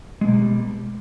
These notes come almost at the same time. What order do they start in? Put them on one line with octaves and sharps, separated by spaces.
G#3 B2 A#3 G3